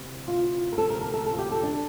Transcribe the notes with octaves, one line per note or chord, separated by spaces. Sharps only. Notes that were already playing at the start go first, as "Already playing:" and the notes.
Already playing: D2 C3 E3
F4
A#4
D2 C3 F3 A4
A#4
A#4
A4
A4
F4
G4
A4
D4